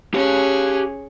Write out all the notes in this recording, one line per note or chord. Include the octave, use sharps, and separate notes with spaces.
C#4 G4 G#4 F5